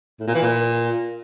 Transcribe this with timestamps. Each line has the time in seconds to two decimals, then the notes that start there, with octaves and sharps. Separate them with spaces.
0.20 A2
0.27 A#2
0.35 E3
0.42 A#2